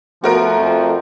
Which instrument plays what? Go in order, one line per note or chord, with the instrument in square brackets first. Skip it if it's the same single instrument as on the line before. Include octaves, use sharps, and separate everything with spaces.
[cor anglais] F3 [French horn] A3 [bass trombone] B3 [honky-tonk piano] F#4 A#4 D7
[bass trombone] F2